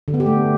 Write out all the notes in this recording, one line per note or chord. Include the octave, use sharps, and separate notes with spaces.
D3
B3
G4
A3